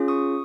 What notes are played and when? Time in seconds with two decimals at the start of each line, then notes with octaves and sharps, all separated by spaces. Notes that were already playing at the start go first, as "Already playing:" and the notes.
Already playing: C#4 F4 G#4
0.08 C#6 D#6